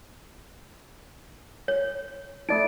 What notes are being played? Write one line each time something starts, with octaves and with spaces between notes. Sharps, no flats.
C#5
A3 D#4 D5 D7